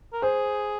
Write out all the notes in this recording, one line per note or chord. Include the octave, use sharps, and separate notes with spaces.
A#4
G#4 C5